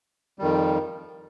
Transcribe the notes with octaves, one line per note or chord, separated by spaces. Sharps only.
F2 D#3 G3